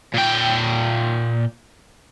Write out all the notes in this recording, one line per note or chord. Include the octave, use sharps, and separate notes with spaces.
A#2 G5